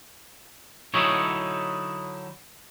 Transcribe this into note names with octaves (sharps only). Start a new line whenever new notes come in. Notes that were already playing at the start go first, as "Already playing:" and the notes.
D3 F#3 D#4 E4 C#5